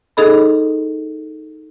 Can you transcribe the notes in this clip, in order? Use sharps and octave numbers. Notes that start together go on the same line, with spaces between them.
D#4 G#4 A4 D#5 B5